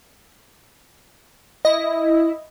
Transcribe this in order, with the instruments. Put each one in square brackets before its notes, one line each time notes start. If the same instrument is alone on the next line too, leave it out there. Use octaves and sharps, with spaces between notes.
[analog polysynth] E4 [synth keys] D#5